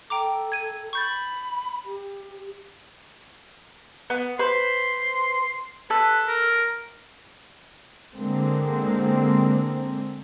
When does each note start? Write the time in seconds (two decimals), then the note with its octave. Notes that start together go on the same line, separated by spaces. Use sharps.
0.10 A4 G5 A#5 D6
0.52 G#6 D#7
0.93 B5 C#6 G6 A6
1.86 G4
4.10 B3
4.39 B4 C5 C6
5.90 A4 B4 F#6
6.27 A#4
8.15 D3 G#3 A#3 C4